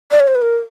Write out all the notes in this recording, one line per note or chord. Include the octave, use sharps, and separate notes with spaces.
D5
C#5
C5
B4
A#4